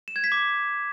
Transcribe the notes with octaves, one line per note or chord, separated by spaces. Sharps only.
E7
G#6
B6
D6